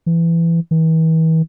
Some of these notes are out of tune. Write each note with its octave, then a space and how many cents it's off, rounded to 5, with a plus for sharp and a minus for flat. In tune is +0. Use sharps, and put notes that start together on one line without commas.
E3 +20
E3 -40